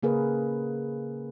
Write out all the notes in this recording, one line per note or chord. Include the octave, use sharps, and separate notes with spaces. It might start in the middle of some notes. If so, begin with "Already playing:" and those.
C#3 A#3 G#4 A#4 B4